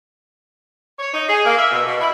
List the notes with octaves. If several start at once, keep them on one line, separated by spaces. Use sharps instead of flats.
C#5
D#4
G#4
A#3
E5
B2
B2
E4